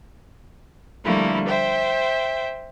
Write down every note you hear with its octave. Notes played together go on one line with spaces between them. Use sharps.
D3 F3 G3 A3 A#3 E4
C5 E5 G5